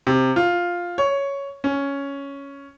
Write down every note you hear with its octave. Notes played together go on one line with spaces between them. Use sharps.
C3
F4
C#5
C#4